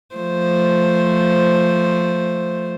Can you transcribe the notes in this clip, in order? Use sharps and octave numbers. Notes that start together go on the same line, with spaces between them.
F3 A3 C5